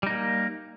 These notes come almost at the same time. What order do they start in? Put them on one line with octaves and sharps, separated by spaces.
G3 D#4 A#3